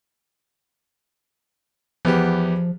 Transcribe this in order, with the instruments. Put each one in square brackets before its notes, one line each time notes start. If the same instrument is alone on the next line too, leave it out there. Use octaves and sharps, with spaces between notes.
[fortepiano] E2 B3 G4 [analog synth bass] F3